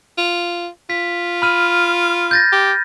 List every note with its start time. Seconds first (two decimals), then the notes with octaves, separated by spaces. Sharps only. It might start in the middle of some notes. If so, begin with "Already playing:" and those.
0.18 F4
0.90 F4 B6
1.42 B5 F6 D#7
2.31 G6 A6 A#6
2.52 G4